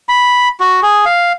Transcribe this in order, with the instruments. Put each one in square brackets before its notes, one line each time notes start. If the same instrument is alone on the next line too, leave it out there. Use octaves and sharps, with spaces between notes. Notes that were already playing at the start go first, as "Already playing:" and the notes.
[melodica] B5
F#4
G#4
F5